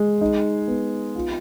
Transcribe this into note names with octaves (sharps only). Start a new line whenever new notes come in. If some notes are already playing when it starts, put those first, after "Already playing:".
Already playing: G#3
D#4
B3
F4